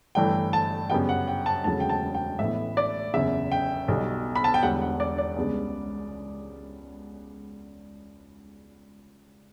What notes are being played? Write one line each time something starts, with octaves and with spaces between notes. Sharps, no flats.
G1 G2 E3 A3 D4 G5
A5
F#2 C#3 G3 B3 G5
F#5
G5
A5
E1 D2 C#3 F#3 A5
G5
A5
G5
A1 A2 E3 B3 E5
D5
F#1 E2 C#3 E5
G5
B1 B2 G3
B5
A5
G5
E1 E2 D3 G3 F#5
F#5
D5
D5
C#2 C#3 G3 B3 D4